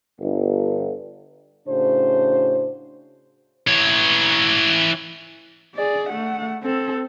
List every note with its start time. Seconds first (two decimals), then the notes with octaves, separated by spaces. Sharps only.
0.20 G1
1.68 A2 C#3 D4 F#4 C5
3.68 E3 C#5
5.75 G#4 D5
6.10 A3 F#5
6.63 C4 A4